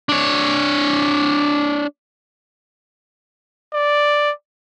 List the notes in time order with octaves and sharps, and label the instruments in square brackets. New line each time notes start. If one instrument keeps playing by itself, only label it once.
[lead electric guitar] D4 C#5
[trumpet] D5